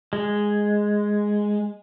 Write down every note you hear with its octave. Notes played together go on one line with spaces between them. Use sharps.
G#3